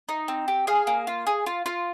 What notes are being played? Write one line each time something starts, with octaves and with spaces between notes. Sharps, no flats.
D#4
C4
G4
G#4 F5
A#3
F4
G#4
F4
F4